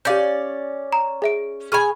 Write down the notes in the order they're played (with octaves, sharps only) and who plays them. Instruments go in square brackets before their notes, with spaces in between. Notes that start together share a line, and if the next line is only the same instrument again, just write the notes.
[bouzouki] C#4 D5 [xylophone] G4 F5 G6
[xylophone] A#5
G#4 E5 D7
[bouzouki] G#4 G#5 [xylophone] B5 C#6 F6